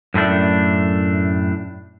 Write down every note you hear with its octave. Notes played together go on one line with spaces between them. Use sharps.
F#2 A2 A3 D4